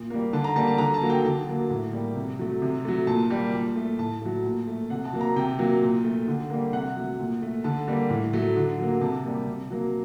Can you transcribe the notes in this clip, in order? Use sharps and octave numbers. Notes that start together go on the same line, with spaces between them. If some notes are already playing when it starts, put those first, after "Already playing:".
Already playing: A#2
G3 A#3
D3 A5
A#5
G3 A#3 A5
A5
D3 A#5
A5
F#3 A#3
G5
D3 A5
F#3 A#3
A2
G3 A#3
C3
F#3 A3
C3
F#3 A3
A#2 A5
G3 A#3
A#2
A3
A2 A5
F#3 A3
A#2
A3
C3 F#5
A5
F#3 A#3
A#5
C3 G5
F#3 A#3
A#2
A3
D3
G3 A#3
C3 F#5
F#3 A3
A#2
A3
D3 A5
G3 A#3
A2
F#3 A3
D3
F#3 A#3
C3 A5
G3 A#3
C3
F#3 A#3